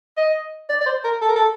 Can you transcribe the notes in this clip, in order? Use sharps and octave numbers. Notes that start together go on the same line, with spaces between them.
D#5
D5
D5
C5
A#4
A4
A#4
A4